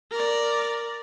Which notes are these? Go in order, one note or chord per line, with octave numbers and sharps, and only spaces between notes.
A#4 D5